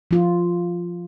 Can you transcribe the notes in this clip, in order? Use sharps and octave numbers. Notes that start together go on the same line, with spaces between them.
F3 F4